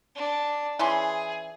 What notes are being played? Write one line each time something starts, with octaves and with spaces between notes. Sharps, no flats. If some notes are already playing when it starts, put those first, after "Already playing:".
D4
E3 C#4 G#4 C6